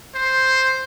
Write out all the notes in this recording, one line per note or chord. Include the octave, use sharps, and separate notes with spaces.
C5